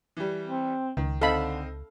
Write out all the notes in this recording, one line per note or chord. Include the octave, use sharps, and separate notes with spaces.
E3 G3
C4
C#2 D#3
D3 C4 D#4 A4 F5 B5